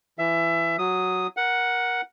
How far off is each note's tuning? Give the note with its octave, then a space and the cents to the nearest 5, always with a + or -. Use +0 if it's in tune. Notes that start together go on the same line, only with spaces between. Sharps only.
E3 +20 E5 +20
F#3 +0 D#6 +0
A#4 +20 F#5 +0